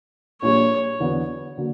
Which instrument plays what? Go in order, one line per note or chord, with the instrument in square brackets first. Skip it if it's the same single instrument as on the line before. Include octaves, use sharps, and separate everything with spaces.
[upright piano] A#1 A#2 G3 [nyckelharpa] C#5
[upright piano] E2 D3 F#3 B3
D3 F#3 A#3